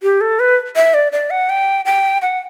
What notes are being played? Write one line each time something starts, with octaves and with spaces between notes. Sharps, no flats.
G4
A4
B4
E5
D5
D5
F#5
G5
G5
F#5